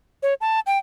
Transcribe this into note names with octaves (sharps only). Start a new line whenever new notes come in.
C#5
A5
G5